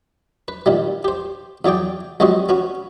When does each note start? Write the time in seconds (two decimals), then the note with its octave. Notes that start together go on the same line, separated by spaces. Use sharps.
0.48 B4
0.66 A#2 D#3 G3
1.04 G4 C5
1.65 E2 F#3 G#4 D5 G5
2.20 C#2 F#3 G3 C4 F#4 D#5
2.49 B3 C#4 F#4